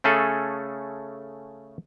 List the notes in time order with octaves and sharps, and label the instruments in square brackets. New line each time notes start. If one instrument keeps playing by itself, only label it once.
[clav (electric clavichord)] C#3 A3 C#4 G#4 A4